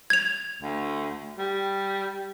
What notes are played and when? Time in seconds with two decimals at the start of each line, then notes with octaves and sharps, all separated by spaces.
0.10 G#6 F7
0.62 D2
1.38 G3